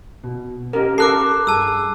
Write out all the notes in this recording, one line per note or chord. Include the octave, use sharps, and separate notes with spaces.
B2
C#4 G4 A#4 D#5
A4 A#4 D6 F#6 C7
G2 G#4 A5 E6